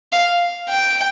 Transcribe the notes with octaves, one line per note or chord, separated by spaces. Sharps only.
F5
G5